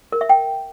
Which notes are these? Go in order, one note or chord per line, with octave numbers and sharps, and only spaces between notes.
A#4
E5
G5